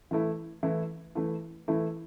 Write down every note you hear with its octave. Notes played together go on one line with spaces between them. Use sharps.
E3 A3 E4
E3 A3 E4
E3 A3 E4
E3 A3 E4